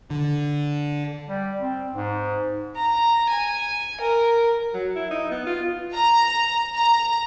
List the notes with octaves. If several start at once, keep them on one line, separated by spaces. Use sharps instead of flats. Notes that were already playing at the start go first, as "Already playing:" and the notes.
D3
G3
C4
G#2
A#5
G#5
A#4
F#3
E4
D#4
B3
F4
A#5
A#5